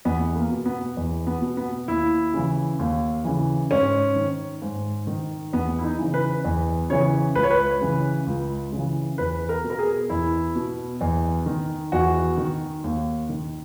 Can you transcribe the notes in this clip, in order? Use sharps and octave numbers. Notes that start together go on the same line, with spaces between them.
E2 B3
A#3
B2
B3
E2
B3
B2
B3
D#2 E4
C#3 E3
D#2
C#3 E3
G#2 C#4
D#3
G#2
D#3
E2 B3
E4
D#4
C#3 E3
B4
E2
C#3 E3 C#5
C#2 B4
C#5
B4
C#3 E3
C#2
C#3
E3
E2 B4
A#4
B2
A#4
G#4
E2 E4
B2
E2
D#3
E2 F#4
D#3
D#2
D#3